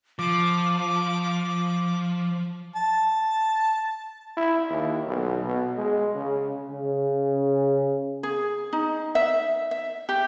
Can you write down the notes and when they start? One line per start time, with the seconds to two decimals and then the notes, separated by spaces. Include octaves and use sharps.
0.19 F3 D6
2.76 A5
4.37 E4
4.70 D#2
5.07 B1
5.44 B2
5.77 G#3
6.15 C#3
6.71 C#3
8.23 G#4
8.73 D#4
9.15 E5
9.71 E5
10.09 G4